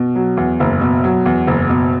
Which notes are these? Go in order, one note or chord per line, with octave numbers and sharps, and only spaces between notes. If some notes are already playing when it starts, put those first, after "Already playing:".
Already playing: B2
F#3
E2
F#1
B2
F#3
E2
F#1
B2